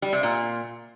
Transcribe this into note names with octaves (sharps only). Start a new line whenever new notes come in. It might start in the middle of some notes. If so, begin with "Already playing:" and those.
G3
C3
A#2